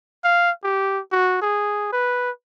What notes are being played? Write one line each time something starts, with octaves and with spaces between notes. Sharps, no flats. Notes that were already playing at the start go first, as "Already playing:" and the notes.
F5
G4
F#4
G#4
B4